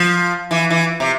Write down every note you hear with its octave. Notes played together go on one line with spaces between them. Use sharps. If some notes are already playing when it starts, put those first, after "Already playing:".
Already playing: F3
E3
E3
C3